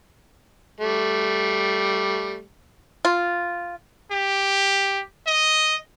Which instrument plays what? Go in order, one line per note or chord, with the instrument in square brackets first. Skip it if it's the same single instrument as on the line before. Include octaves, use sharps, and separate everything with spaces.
[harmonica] G3 A3
[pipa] F4
[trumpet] G4
D#5